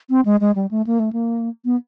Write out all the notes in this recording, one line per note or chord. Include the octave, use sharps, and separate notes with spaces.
C4
G#3
G#3
G3
A3
A#3
A3
A#3
B3